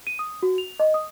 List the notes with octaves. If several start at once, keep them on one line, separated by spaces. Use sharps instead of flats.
D#7
D#6
F#4
F7
D#5
D#6